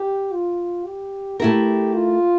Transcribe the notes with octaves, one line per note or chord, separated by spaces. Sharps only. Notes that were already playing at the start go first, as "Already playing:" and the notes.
Already playing: G4
F4
G4
A3 E4 G4 A#4
F4